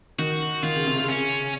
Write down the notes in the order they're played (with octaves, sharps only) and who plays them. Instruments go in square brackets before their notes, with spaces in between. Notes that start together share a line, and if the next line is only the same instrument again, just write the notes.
[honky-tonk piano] D#3 [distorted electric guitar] F#4
[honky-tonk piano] D#3 [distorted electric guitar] F4
[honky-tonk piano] C#3
C3
C#3
[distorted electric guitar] C#4